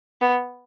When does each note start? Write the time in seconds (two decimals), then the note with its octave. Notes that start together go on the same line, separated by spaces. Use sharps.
0.21 B3